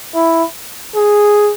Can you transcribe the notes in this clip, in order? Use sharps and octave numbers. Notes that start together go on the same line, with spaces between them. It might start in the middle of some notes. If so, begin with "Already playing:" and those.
E4
G#4